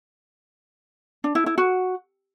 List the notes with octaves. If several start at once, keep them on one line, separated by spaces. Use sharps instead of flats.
D4
E4
E4
F#4